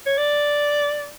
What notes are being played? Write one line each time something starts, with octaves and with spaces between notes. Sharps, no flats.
C#5
D5